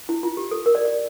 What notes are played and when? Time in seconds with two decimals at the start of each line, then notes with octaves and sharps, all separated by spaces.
0.09 E4
0.23 F4
0.37 G4
0.51 A4
0.66 A#4
0.75 D5
0.85 D5